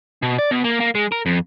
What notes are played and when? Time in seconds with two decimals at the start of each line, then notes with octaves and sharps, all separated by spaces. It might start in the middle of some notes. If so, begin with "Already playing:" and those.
0.23 B2
0.39 D5
0.51 B2
0.64 A#3
0.80 A#3
0.95 G#3
1.12 A#4
1.26 F2